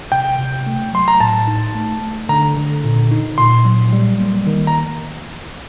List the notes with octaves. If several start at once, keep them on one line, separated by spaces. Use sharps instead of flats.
C3 G5
C3
A3
F#3 C6
A#5
A2 A5
D#4
A3
A3
D3 A#5
D3
A#2
D#4
A#2 C6
F#3
G3
A#3
D#3
A#5